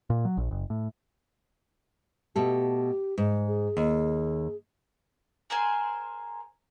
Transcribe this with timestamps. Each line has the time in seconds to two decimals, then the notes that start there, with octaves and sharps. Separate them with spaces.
0.10 A#2
0.25 F#3
0.37 A#1
0.51 F#1
0.70 A2
2.36 B2 A3 G4 A4
3.18 G#2
3.47 G#4
3.77 D#2
5.50 G#4 A#4 C5 G#5